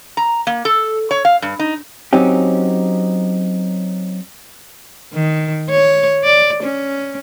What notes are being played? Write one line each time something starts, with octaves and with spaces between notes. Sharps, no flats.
A#5
A#3
A4
C#5
F5
G2
D#4
F#3 C4 C#4 D#4 G4
D#3
C#5
D5
C#4